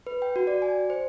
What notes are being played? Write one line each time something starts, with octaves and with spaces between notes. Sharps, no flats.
B4
G5
F#4
D5
G#5
C5